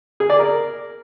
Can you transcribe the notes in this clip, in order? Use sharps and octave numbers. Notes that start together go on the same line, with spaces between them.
G#4
D5
A#4